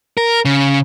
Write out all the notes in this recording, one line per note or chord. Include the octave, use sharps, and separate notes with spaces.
A#4
C#3